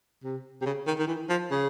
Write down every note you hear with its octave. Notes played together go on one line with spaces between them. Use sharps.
C3
C3
C#3
D#3
D#3
E3
F3
C#3